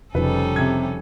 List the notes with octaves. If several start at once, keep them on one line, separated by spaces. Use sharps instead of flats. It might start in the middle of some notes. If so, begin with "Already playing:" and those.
F1 C#3 F3 G3 C#4 D#4 A4 B4
C3 G#6